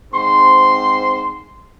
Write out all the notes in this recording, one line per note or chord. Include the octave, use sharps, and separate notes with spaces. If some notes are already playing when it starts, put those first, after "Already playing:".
G#2 C4 C5 C6